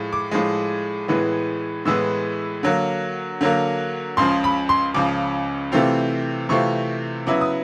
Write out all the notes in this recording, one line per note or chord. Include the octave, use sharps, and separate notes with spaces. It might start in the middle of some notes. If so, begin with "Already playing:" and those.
Already playing: A2 F3 G#3
D6
A2 F3 G#3
A2 E3 G#3 B3
A2 E3 G#3 B3 E6
D3 F#3 A#3
D3 F#3 A#3
C#2 C#3 F3 C6
B5
C6
C#2 C#3 F3 D6
C3 E3 A3 C4 F4
C3 E3 A3 C4 F4 C#6
C#3 F#3 B3 E4 D6
D#6